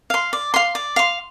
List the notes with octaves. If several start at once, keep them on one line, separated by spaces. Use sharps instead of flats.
F5 C6
D5
F5 C6
D5
F5 C6